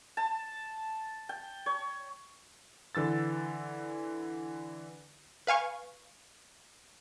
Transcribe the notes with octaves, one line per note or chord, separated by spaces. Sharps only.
A5
G5
C#5
D3 E3 E6 A6
B4 F5 G#5 C#6